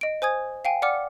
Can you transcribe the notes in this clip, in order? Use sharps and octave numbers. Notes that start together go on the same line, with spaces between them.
D#5 D7
C5 G#5 D#6 G#6
F5 G5 G#5
D5 F#5 D6 F6 C#7